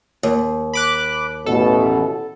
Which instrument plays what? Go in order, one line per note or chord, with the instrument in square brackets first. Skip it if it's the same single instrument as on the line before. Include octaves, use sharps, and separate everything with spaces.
[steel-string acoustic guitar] D#2
[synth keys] B5 D6 F#6
[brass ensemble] A1 B2 [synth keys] A4